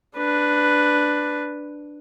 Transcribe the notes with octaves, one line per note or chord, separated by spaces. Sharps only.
D4 B4